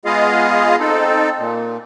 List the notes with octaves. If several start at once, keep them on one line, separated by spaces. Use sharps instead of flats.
G#3 B3 F4 G#4 D#5 F5
C4 D#4 A4
A#2